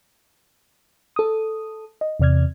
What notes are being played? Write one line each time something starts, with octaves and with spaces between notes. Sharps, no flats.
A4 D#6
D#5
E2 C3 D5 F6 G#6